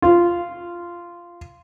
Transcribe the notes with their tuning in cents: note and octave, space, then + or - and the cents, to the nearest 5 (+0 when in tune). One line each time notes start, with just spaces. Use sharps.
F4 -10